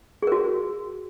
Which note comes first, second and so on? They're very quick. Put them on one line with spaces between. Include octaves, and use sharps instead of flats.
G#4 A#4 F#4